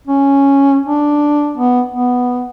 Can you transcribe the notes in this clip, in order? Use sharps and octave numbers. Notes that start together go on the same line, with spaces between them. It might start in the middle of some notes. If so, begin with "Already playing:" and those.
C#4
D4
B3
B3